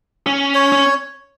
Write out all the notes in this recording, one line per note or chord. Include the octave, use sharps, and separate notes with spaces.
C#4
C#5
C#4